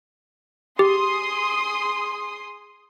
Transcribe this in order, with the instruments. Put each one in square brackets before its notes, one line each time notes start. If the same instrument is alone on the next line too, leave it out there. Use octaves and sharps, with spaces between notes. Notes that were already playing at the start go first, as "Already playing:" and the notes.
[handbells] G4 [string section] G#4 C6 D#6